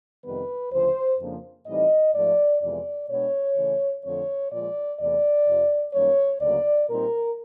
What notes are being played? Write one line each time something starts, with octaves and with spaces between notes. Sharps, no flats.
F2 C3 D#3 G3 B3 B4
D2 C#3 F3 C5
F2 C#3 F3 A#3 D4
A2 E3 G3 C4 D#4 D#5
G#2 F3 A3 D5
F2 C3 E3 G#3 B3 D5
B2 G#3 B3 D4 C#5
C#3 E3 A3
F2 D3 F3 A3 C4 C#5
A#2 F3 G#3 D5
E2 C3 E3 A3 D5
F2 C3 F3
F#2 D#3 G3 A#3 C#4 C#5
D2 C#3 F#3 A#3 D5
A#2 G3 C4 D#4 A#4